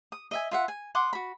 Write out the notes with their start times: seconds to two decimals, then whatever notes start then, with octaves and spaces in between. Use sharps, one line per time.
0.12 D#6
0.31 D#5 E5 G#5
0.51 F4 E5 F#5
0.68 G#5
0.95 F#5 C6 D6 D#6
1.13 F#4 B5